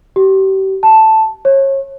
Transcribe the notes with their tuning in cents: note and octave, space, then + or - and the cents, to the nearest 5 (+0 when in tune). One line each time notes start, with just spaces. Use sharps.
G4 -35
A5 +0
C#5 -30